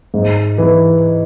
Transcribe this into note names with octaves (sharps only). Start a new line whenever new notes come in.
G#2
E3